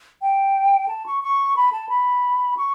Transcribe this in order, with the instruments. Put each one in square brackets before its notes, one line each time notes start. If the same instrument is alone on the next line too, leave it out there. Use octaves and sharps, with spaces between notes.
[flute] G5
A5
C#6
C#6
B5
A5
B5
C#6